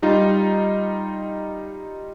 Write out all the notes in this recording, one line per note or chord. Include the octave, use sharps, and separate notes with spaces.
G3 D#4 F4